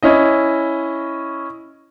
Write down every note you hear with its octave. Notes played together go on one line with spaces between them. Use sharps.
C#4 E4 D#5